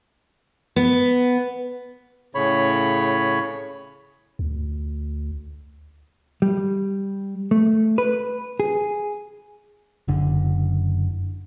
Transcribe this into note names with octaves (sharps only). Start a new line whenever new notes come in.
B3
A2 C#3 C#5 B5
D2
G3
A3
B4
G#4
F#1 D3